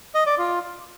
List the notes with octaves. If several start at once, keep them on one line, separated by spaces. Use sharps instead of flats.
D#5
D5
F4